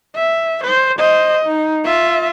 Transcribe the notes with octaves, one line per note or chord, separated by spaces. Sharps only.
E5
C5
C5 D#5
D#4
F4 E5